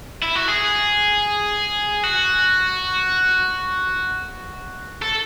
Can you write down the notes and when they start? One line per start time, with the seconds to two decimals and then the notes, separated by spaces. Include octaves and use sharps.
0.22 E4
0.35 F#4
0.48 G#4
2.04 F#4
5.02 A4